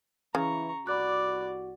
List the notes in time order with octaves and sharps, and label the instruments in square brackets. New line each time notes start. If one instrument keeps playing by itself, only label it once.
[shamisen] C#3 [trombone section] E3 [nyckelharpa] A#5 C#6
[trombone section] C2 F#4 [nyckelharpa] D5 [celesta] B5 D6 F#6